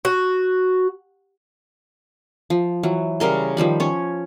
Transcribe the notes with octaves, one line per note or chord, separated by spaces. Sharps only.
F#4
F3
E3 F#3
C#3 G3 A#4 C6
D#3 F3 G3 B5
C#4 C#5